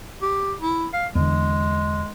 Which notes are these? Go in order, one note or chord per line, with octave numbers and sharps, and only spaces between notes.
G4
E4
F5
E2 D3 G#3